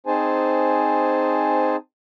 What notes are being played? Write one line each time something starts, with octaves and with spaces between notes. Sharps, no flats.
C4 D#4 G#4 C5 G#5 A5